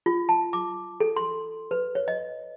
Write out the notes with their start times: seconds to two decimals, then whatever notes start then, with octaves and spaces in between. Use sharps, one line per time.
0.06 F4
0.29 A5
0.53 D6
1.00 A4
1.17 C6
1.71 B4
1.95 C#5
2.08 D#5